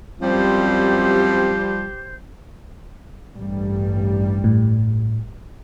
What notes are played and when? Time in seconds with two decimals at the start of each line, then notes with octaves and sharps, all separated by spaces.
0.22 F#2 F3 G3 C4 G4 C5
3.36 A1 G2 G3
4.44 A2